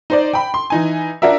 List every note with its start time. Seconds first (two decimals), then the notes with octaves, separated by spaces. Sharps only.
0.10 D#4 C5 D5
0.33 G5 B5
0.54 C6
0.70 E3 D#4 G#5
1.22 D4 F4 F#4 A#4 E5